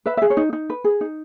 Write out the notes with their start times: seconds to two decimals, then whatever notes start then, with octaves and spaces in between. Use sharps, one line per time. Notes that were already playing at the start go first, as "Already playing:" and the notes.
0.06 B4 E5
0.17 G#4 E5
0.30 C#5
0.37 D#4
0.53 D#4
0.70 B4
0.84 G#4
1.01 D#4